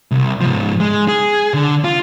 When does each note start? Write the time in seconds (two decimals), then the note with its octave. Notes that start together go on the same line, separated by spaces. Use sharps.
0.11 C2
0.41 G#2 F3
0.80 G#3
1.08 G#4
1.54 D3
1.84 F4